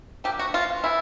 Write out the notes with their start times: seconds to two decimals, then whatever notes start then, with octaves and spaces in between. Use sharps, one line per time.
0.24 D3 F3 A#3 G4
0.39 F#4
0.54 F4
0.84 F3 G#3 B3 E4